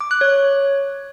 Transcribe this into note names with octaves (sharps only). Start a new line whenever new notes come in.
D6
F#6
C#5